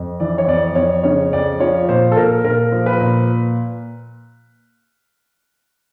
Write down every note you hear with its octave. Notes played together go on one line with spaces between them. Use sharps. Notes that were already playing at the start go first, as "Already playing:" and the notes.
Already playing: F2
E3 D5
C#5
F2 D5
F2 C#5
C#3 C#5
F2 D5
F3 C#5
A#2 C5
A4
A#2 A#4
A#2 A#4
F3
B4
A#2